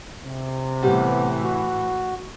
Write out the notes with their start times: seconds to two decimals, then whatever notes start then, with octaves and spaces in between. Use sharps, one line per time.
0.25 C3
0.83 A2 E3 G3 B3
1.43 F#4